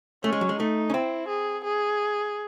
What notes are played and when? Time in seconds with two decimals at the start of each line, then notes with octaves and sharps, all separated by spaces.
0.24 A3 C#4
0.33 G#3
0.41 F#3
0.49 G#3
0.59 A3 D#4
0.90 C#4
0.94 C4 E4
1.28 G#4
1.64 G#4